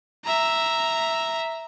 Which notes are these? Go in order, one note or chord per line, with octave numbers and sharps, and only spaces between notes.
E5 A#5